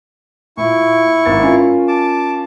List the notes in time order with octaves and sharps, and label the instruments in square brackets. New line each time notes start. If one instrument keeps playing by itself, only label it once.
[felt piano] A#2 [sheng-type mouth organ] E4 C#6
[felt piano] G#1 A#3 A6
C#4 F4 A#4
[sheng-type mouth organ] A5 D6